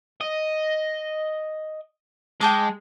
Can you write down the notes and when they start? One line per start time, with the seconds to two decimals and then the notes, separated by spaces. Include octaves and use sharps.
0.21 D#5
2.41 G#3 G5 A5 D6